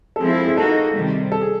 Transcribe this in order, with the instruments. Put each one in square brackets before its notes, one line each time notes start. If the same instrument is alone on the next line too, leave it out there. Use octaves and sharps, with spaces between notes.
[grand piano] A4
[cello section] F3 G#3 C4 E4 [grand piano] G#4
[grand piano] A4
G#4
[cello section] A#3 D#4 F#4 [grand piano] A4
[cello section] C3 D#3 G3
[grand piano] A4
G#4